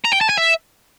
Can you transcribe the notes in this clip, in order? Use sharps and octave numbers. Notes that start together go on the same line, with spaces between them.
A#5
G5
A5
G#5
E5